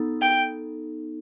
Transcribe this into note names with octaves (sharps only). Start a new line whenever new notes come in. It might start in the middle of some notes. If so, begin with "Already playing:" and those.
Already playing: B3 D#4 A4
G5